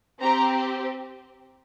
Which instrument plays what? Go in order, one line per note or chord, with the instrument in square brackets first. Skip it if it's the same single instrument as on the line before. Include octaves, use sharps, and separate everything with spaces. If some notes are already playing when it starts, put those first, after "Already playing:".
[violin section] C4 G4 A#5